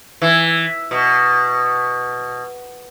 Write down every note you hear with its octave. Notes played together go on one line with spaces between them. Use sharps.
E3
B2